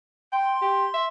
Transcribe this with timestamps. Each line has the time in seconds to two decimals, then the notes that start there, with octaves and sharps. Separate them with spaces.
0.32 G5 C6
0.62 G4
0.94 E5